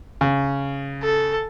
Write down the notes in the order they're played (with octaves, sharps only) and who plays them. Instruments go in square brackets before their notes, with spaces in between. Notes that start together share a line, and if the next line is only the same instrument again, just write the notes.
[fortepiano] C#3
[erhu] A4